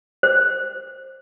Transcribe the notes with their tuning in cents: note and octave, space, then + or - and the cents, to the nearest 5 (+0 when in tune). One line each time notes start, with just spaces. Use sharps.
C5 +20